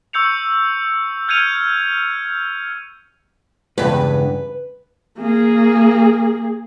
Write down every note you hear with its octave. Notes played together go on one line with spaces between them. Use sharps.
C#6 E6 G6 C#7 F7
F6 G6 G#6 C#7 D#7 F7
E2 G2 C#3 G#3 B4
A#3 G#4